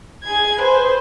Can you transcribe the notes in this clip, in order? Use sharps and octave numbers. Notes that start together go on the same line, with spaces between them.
G#4 G#6
B4 C5